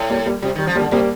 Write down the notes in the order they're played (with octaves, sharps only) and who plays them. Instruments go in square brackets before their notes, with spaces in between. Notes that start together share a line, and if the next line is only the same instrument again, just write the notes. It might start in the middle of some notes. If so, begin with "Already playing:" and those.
Already playing: [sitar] A2
[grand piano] G3 A#3
G3 A#3
[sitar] C3 [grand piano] G3
[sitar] D#3 [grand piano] G3
[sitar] F3
[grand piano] G3 A#3
[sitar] D3
[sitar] C3 [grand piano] G3 A#3